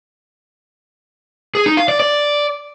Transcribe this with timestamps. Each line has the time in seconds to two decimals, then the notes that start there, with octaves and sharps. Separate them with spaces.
1.55 G#4
1.66 D#4
1.77 F5
1.88 D5
2.00 D5